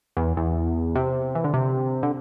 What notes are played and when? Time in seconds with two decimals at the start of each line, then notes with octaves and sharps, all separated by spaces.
0.17 E2
0.37 E2
0.95 C3
1.35 E3
1.44 D3
1.54 C3
2.03 D3